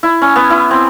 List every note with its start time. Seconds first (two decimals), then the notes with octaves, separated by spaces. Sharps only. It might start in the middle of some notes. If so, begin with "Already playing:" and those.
0.03 E4
0.22 C#4
0.36 B3
0.50 E4
0.71 C4